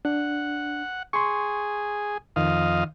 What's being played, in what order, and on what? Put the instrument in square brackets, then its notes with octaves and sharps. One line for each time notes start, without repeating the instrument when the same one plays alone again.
[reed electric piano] D4 [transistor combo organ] F#5
[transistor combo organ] G#4 [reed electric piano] C6 C#6
[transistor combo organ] F2 D#5 F5 [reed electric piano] D#3